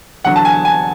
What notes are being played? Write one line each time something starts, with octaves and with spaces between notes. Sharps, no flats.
E2 D3 F#3 F#5
A5
G#5
G#5